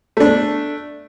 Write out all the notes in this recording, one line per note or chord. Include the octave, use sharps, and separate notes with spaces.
A3 D4